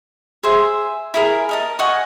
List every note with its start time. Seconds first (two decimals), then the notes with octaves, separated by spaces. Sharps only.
0.43 G#4 C5 E5
1.14 E4 G#4 A#4
1.49 A#4 D#5 A5
1.79 D#5 F#5 G#5 C#6